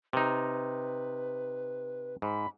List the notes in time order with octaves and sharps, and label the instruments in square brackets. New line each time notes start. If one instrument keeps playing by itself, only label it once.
[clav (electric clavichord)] C3 D#4 [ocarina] B4
[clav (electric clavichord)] G#2 [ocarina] B5